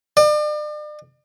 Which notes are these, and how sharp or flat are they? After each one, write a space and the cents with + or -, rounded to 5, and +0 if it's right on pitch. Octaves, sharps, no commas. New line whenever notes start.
D5 +40